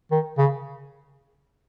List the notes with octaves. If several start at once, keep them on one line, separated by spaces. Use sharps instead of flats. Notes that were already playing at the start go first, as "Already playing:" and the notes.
D#3
C#3